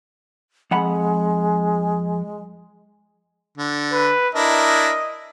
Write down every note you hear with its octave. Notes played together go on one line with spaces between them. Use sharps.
F2 G#3 F#5 B5
D3
B4
D4 E4 A#4 D#5